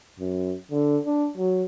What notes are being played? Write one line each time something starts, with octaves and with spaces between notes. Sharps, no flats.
F#2
D3
D4
F#3